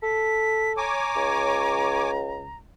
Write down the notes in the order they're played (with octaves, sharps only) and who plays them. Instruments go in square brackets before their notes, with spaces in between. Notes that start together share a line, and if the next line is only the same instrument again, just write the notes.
[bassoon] A4 [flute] B6
[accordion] C#5 G#5 D6 [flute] A#5
[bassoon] C#2